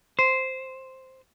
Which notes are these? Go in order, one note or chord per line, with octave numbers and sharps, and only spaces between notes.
C5